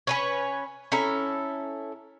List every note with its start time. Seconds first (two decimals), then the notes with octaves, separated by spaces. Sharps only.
0.07 C#4 B4 C#5
0.92 C#4 E4 A4 A#5